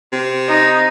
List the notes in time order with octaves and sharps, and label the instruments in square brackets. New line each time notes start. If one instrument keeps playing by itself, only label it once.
[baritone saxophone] C3
[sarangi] D#4